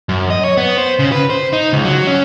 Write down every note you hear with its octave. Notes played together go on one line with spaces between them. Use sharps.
F#2
D#5
C#5
B3
C5
C#3
B4
C5
D#4
C#2
F#3
C#4